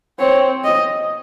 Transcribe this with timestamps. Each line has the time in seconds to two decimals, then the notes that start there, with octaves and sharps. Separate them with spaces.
0.19 C4 C#5
0.64 D#5